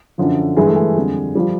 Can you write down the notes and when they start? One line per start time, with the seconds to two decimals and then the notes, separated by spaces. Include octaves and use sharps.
0.18 F#2 D3 F3
0.57 G2 E3 G3 G#3
0.67 A3
0.76 G#3
0.96 F2 D3 G3
1.35 F3 G3